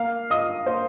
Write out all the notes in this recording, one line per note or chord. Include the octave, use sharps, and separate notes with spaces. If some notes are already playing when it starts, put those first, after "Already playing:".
Already playing: A#3 F5 F6
F4 D#5 D#6
A#3 C5 C6